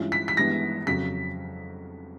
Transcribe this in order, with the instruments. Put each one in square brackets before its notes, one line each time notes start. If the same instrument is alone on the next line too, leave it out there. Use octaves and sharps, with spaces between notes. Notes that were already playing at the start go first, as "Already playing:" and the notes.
Already playing: [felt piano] G2 E3 G#3 C#4 F4
[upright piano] B6
B6
[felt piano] G2 E3 G#3 B3 [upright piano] A#6
[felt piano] F2 C#3 F#3 [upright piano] B6